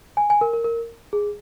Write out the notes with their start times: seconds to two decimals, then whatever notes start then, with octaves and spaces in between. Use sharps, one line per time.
0.17 G#5
0.30 G#5
0.41 A#4
0.53 A#4
0.65 A#4
1.13 G#4